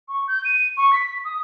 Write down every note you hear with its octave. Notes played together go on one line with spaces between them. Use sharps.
C#6
G6
D#7
C#6
B6
D#6